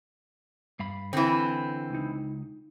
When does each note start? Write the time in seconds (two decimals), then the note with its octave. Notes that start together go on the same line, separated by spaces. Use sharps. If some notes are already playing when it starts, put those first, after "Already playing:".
0.79 G2 F5 B5
1.13 D3 E3 C4
1.90 C#2 D#4